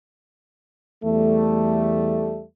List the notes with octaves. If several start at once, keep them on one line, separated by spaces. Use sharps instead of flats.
E2 G3 A3